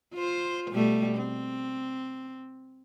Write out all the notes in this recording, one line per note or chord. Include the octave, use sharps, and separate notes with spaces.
F4 C5
B2 G3 A3
C4